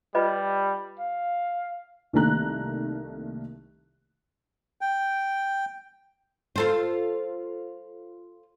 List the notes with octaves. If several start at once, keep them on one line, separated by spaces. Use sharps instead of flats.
G3 F4 B4 D#5
F5
C2 D#3 A3 A#3 A#5 F#6
G5
F4 A4 C5